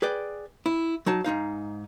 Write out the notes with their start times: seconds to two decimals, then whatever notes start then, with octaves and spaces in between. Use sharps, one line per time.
0.02 G#4 B4 D5 G5
0.66 E4
1.06 F#3 D#4 A5
1.24 G#2 G#3 D#4 F5